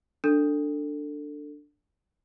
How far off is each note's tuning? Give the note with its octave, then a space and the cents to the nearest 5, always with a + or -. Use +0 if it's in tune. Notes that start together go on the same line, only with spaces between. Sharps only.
D4 +0 A4 +20